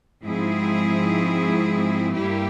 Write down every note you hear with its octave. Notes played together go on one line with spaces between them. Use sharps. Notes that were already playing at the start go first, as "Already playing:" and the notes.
G#2 F3 C4 E4 G#4
G2 G3 A#3 E4 G4